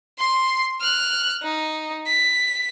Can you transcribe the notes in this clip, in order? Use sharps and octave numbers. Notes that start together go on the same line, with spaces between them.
C6 C7
F6 F#6
D#4
B6